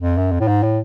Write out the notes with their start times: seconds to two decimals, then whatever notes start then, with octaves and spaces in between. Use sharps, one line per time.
0.01 F2
0.18 F#2
0.32 F2
0.41 A2
0.48 G#2
0.63 A2